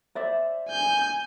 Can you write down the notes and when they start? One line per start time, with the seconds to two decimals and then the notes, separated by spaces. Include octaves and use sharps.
0.15 C5 D5 E5
0.70 G#5 G6